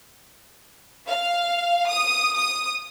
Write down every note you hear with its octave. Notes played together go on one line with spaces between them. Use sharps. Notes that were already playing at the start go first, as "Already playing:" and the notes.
F5
D#6
D#6